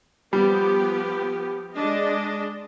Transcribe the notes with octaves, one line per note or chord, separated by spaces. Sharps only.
F3 G3 B3 G4
G#3 D4 D#5